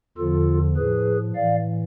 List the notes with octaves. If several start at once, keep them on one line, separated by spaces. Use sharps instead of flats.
E2 D3 F3 F4 A4
A2 F3 G#4 B4
A2 E3 D5 F5